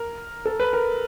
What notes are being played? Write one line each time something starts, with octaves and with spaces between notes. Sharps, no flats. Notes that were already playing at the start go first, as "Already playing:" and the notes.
Already playing: A#4
A4
B4
A#4